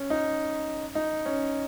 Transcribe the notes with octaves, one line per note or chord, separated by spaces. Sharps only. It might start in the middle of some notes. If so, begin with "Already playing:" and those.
Already playing: C#4
D#4
D#4
C#4